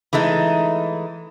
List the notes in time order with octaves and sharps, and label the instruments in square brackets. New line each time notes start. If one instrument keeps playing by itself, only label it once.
[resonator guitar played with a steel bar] E3 G#3 A3 D#4